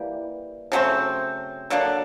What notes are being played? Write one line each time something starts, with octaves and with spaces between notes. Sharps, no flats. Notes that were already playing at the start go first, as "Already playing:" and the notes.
Already playing: E3 G3 A#3
C#3 F#3 A3 C4
D3 F#3 A#3 D4